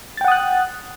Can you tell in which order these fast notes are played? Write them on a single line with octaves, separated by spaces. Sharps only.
A6 G5 F#5 D#6 F#6